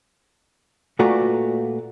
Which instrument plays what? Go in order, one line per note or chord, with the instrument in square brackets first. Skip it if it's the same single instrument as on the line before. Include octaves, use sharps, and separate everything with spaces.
[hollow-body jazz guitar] A#2 A3 F#4 B4 D5 A#5